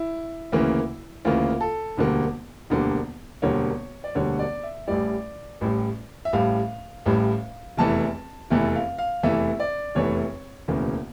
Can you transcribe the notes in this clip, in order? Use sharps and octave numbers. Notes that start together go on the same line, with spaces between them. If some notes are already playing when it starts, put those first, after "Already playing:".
Already playing: E4
D2 C#3 E3 A#3
D2 C#3 E3 A#3 F4
A4
E1 D2 D3 G3 A#3
E1 D2 D3 G3 A#3
E1 D2 D3 G3 A#3 C#5
D5
E1 D2 D3 G3 A#3 C#5
D5
E5
A1 A2 G3 D5
A1 A2 G3
E5
A1 A2 G3 F5
A1 A2 G3
F1 E2 E3 A3 A5
F1 E2 E3 A3
F5
F5
F1 E2 E3 A3 E5
D5
F1 E2 E3 A3 C#5
E1 D2 C#3 E3 A#3